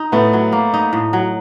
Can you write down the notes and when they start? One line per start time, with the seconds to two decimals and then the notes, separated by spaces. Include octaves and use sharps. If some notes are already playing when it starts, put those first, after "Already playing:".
Already playing: D#4
0.12 A2 A3 B3
0.33 F#3
0.52 A#3
0.74 D#4
0.93 A2
1.13 F#3